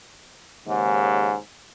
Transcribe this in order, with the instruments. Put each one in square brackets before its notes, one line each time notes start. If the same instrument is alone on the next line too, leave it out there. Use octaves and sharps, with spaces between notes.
[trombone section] D#2 G#2 C#3